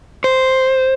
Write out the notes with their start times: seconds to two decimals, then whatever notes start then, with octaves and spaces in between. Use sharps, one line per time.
0.24 C5